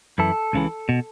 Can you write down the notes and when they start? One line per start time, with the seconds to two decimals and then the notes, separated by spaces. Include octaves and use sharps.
0.18 F#2 E3 A4
0.53 C#2 C#3 E3
0.89 B2